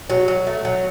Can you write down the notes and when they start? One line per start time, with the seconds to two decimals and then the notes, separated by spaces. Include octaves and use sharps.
0.10 F#3
0.28 F#3
0.47 A3
0.65 F#3